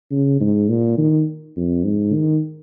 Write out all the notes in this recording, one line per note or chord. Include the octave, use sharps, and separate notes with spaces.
C#3
G#2
A#2
D#3
F2
G#2
D#3